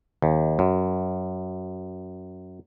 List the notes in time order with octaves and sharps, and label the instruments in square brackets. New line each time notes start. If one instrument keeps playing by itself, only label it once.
[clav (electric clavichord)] D#2
F#2